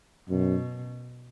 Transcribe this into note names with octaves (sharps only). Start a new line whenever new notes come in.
F#2 B2